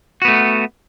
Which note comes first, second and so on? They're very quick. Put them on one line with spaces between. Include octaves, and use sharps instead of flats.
F#4 B3 A3